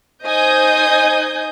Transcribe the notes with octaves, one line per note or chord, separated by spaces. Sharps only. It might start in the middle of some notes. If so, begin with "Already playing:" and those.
D#4 C5 D#5 G#5 D#6 G6